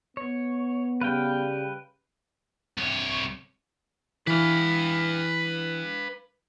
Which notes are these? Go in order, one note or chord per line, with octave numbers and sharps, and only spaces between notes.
B3 C#5
C#3 G3 B4 F5 G5
C2 C#5
E3 B4 F5